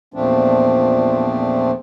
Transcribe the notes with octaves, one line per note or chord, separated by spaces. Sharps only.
E2 A#2 F3 A3 C4 D4